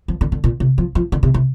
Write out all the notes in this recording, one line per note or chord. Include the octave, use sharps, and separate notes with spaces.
F3
D3
D3
A#2
C3
F3
F3
D3
C3
C3